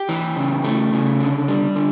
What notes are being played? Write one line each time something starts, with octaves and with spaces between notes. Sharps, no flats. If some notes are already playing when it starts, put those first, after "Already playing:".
Already playing: G4
E3
C#3
A3
C#3
D3
G3
D3